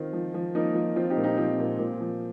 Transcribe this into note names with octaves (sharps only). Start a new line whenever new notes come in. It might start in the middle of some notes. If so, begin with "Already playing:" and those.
Already playing: D#3 C4 F4
F3
F3
F3 A#3 D#4
F3
F3 C4 F4
D#4 G4
A#2
D#4 G4
F3 C4
A#2
A#2
F3